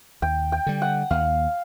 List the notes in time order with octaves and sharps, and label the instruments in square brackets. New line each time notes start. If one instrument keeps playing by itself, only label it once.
[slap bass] D#2 [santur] G5
[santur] G5
[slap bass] D3 G3
[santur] F#5
[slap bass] D#2 [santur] F5